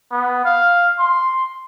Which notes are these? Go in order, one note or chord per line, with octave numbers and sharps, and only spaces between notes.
B3
F5
C6